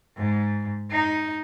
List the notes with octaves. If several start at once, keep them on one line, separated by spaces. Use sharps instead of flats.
G#2
D#4